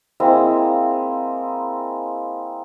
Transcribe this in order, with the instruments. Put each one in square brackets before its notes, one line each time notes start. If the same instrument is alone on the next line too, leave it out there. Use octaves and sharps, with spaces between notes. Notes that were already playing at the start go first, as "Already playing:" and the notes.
[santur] G#3 A#3 C4 E4